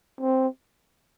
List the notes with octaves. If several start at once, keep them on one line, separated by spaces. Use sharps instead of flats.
C4